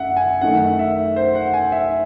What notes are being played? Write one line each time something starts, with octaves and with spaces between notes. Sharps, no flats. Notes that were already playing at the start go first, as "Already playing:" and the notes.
Already playing: F#2 A3 E5 F#5
G#5
F#2 D#3 A3 D#4 F#5
E5
C5
F#5
G#5
E5